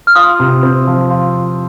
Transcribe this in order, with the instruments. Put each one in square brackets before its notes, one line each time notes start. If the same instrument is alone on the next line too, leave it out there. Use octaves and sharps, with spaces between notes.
[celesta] F6
[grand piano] F4 [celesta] D#6
[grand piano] C3
C4
F3
F4